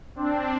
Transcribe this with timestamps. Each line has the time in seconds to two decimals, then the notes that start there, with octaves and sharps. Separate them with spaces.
0.15 C4 D4